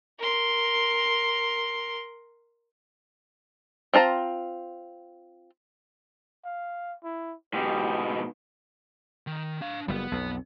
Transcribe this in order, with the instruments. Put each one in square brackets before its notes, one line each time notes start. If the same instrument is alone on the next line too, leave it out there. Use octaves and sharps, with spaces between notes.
[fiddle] A#4 C6
[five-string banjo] C4 F4 A5 A#5
[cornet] F5
E4
[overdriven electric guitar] G#2 B2 [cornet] G4
[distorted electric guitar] D#3
D4 F5
[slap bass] F#1 G3 [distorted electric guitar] B3
[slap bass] B1 F2